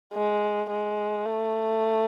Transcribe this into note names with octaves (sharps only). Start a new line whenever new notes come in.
G#3
G#3
A3